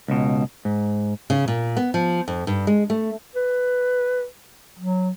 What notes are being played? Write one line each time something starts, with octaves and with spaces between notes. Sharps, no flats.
C#2 B2
G#2
C#3
A#2
B3
F3
F2
G2
G#3
A3
B4
F#3